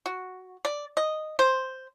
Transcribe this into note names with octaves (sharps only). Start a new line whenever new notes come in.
F#4
D5
D#5
C5